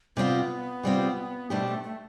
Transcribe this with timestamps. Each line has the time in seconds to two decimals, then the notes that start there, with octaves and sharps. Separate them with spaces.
0.16 C3 G3 B3 C4 F4
0.83 C3 G3 C4 F4
1.50 B2 G3 A3 D4 G4 C5
1.67 A3
1.83 A3